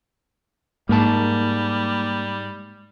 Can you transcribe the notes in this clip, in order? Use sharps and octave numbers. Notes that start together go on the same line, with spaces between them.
G#2 G3 A#3 A#4 A5